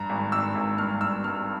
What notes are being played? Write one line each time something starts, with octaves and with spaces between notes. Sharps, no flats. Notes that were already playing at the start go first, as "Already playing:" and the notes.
Already playing: G2 A#5
G#1
G#1 E6
G#1
G2 F6
G2 E6
G2 F6